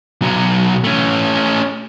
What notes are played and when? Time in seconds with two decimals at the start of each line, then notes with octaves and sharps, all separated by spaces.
0.22 B1 F#3
0.84 A3 C#4